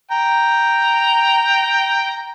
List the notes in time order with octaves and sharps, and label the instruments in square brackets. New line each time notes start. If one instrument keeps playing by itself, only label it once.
[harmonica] G5 A#5